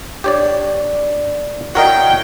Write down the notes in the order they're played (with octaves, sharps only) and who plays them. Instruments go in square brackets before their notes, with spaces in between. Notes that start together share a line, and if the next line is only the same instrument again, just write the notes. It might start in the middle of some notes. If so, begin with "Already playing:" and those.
[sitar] D4 [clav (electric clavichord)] G4 C#5 D5
[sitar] E4 C#5 [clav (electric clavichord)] F#4 A#4 D#5 [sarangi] G5